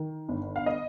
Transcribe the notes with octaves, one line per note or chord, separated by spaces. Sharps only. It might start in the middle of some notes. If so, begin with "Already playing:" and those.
Already playing: D#3
G1
F5
D#5